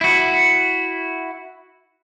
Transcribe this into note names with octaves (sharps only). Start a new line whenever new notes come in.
E4 F#4